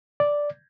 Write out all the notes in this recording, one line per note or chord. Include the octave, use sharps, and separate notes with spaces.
D5